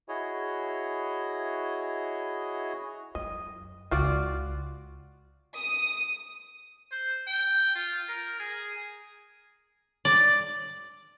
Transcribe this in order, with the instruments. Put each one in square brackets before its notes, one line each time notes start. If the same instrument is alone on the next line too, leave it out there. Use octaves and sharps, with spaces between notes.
[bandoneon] E4 F#4 G#4 C#5 D#5
[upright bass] F#2 [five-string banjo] D#5
[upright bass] C#2 [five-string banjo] F4 F#4 D5
[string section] D#6
[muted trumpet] C5
G5
F4
A#4
G#4
[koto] D5